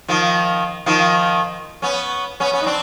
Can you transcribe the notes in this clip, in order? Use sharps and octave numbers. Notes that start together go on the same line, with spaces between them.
D#3 F3
D#3 F3
B3 C#4
B3 C#4
B3 C#4
D#4
C4 D4